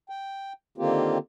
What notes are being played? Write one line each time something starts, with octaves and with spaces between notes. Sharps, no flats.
G5
D3 D#3 A#3 C4 F4 G4